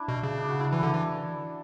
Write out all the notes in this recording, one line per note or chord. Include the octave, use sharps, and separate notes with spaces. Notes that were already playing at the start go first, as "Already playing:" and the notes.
Already playing: D4 E4
B2
C#3
D4
F#4
E4
E3 E4
D3 D4
E3